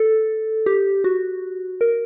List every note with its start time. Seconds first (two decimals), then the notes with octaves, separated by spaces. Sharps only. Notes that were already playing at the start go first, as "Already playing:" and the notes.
Already playing: A4
0.66 G4
1.04 F#4
1.81 A#4